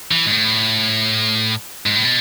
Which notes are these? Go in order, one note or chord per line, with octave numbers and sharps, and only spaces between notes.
E3
G#2
A2
G#2
A2
B2